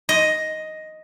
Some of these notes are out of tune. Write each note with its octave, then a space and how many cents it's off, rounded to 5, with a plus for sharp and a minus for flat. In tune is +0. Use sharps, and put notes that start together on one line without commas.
D#5 +5